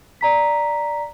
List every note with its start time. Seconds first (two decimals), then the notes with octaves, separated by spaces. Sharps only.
0.21 D5 A#5 B6